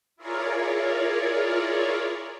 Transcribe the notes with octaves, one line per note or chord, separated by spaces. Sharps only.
E4 F4 G#4 A#4 C#5 D5